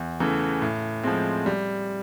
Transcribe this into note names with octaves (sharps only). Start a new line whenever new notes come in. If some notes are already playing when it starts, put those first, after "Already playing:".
Already playing: E2
C#3 E3 A3
A2
F3 G#3 C4
G3